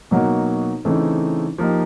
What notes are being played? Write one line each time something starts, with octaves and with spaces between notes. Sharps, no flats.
B2 F#3 A#3 D#4 F#4
C#3 E3 A3 C4 D#4
F3 A#3 D#4 G4